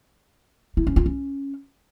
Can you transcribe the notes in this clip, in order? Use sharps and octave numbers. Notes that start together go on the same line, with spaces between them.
E4
C#4
F4
C#4